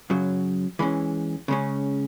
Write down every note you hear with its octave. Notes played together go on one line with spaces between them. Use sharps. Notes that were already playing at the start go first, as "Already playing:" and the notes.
F#2 C#3 F#3
E3 G#3 C#4
C#3 G#3 C#4